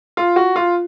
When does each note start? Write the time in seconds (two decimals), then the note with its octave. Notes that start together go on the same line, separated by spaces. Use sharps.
0.17 F4
0.36 F#4
0.56 F4